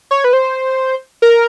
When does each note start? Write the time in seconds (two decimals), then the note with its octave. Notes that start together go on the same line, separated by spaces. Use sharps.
0.11 C#5
0.24 B4
0.33 C5
1.22 A#4